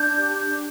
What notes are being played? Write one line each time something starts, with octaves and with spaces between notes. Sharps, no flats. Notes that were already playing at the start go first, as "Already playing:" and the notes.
Already playing: D4 G6
G4